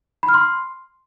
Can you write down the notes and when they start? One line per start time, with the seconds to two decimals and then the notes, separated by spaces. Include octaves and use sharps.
0.23 B5
0.29 F6
0.34 C6